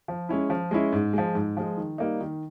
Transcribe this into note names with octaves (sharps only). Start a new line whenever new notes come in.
F3
G#3 C#4 E4
F3
G#3 C#4 E4
G#2
F3 G#3
G#2
F3 G#3
D#3
G3 A#3 D#4
D#3